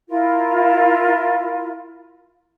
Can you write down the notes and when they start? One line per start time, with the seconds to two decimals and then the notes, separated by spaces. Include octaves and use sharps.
0.09 E4 F4 A#4